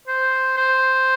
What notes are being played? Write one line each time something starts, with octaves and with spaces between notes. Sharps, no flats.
C5
C5